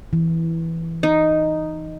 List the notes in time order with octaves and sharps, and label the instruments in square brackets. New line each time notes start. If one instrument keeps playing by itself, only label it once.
[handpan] E3
[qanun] D#4